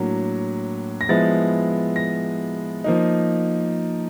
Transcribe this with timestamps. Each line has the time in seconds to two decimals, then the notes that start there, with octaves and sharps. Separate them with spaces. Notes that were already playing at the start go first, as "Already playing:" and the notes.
Already playing: A2 F#3 A#3 D4
1.01 A#6
1.09 F3 G#3 B3 E4 A6
1.96 A#6
2.84 F3 A#3 D#4